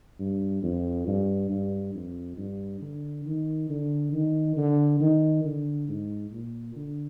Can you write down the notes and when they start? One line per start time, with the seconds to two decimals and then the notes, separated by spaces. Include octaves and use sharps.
0.19 G2
0.63 F2
1.07 G2
1.50 G2
1.95 F2
2.37 G2
2.81 D3
3.25 D#3
3.69 D3
4.13 D#3
4.57 D3
5.00 D#3
5.45 D3
5.89 G#2
6.31 A#2
6.76 D3